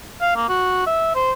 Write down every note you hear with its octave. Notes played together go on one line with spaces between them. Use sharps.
F5
A#3
F#4
E5
C5